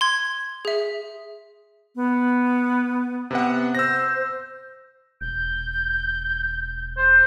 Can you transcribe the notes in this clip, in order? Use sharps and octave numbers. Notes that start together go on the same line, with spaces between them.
C6 G#6
G#4 E5
B3
C3 B3 F#5
C5 E6 A#6
E1 G6
C5